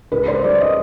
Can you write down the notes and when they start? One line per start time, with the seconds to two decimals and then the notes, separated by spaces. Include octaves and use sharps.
0.12 C#2 B4
0.28 C5
0.44 G3 D5
0.61 D#5